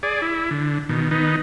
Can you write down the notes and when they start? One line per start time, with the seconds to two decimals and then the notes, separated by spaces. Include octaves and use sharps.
0.03 G#4 D5
0.22 E4
0.51 D3
0.89 B2 D#3
1.11 D#3 B3 D#4